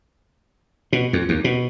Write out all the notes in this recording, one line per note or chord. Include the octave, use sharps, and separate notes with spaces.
B2
F2
D#2
B2